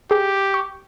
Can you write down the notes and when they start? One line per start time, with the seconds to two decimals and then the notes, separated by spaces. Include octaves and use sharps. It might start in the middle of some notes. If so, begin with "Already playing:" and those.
0.11 G4 G#4
0.54 C#6